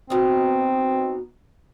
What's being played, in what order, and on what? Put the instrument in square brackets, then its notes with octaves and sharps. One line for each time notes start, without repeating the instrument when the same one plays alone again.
[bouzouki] B2 D#4 [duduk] C4